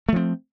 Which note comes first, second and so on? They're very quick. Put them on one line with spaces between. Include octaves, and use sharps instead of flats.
A3 F3 C4